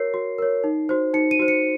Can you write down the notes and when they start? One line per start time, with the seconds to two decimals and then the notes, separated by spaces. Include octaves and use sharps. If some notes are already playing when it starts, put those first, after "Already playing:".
Already playing: F#4 A#4 C#5 C7
0.14 F#4
0.38 A#4 C#5
0.64 D#4
0.89 F#4 C5
1.14 D#4 C#7
1.31 D#7
1.39 F#4 C5
1.48 C#7